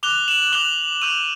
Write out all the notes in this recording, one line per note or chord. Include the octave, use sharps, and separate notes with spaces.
D6 F#6 F7 G7
E7 F#7
D6 F#6 F7 G7
C#6 E6 G6 D#7 F7